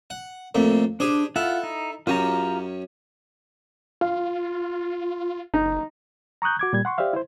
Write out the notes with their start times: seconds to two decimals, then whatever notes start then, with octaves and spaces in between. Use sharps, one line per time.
0.10 F#5
0.55 F2 A2 A#3
1.00 D4 G4 G#4 C5
1.36 E4 F4 A4 F#5
1.63 D#4
2.07 F#2 C#4 F4 G4 A#5
4.01 F4 F5
5.54 F#1 D#4
6.42 A#5 C#6 D#6 F#6 G6
6.59 F#4 D6 G#6
6.73 A#2 G3 G#6
6.85 F#5 C6 C#6
6.98 G4 C5 D5 E5 F5
7.13 E4 C5